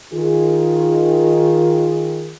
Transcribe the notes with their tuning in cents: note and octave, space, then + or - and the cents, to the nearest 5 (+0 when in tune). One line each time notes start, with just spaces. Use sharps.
D#3 +10 F4 +0 G#4 -10